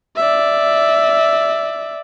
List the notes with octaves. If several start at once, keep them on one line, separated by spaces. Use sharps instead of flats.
D5 E5